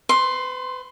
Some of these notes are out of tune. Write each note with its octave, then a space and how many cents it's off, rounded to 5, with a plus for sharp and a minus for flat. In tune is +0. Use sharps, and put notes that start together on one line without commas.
B4 +40 C6 +10